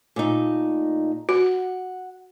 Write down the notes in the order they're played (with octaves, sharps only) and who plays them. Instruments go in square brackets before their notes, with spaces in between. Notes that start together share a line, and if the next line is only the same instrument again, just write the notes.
[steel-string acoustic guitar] A#2 A3 D#4
[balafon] F#4 [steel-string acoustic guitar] F#5